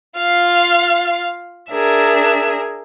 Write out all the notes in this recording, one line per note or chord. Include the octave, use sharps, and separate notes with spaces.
F4 F5
D4 G#4 A#4 E5